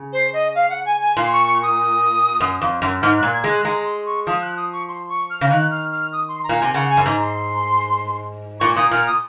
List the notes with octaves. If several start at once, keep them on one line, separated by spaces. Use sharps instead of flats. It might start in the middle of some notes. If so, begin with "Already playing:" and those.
Already playing: C#3
C5
D#5
F5
F#5
G#5
G#5
A#2 C6
C#6
C#6
D#6
F#2
F2
F#2
G#2 F6
A#2 F#6
G#6
G#3
F#6
G#3 A#5
C6
C#6
F3 D#6
F#6
D#6
C#6
C6
C#6
F6
C#3
D#3 F#6
F6
F6
D#6
C6
A#5
A#2
C3 G#5
C#3 F#5
G#5
F#2
G#2 A#5
C6
A#2 C#6
A#2 D#6
A#2 F6
D#6